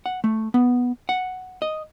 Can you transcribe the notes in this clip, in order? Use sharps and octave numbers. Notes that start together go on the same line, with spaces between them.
F#5
A3
B3
F#5
D#5